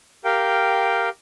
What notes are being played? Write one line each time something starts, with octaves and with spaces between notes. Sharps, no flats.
G4 A#4 F5 G5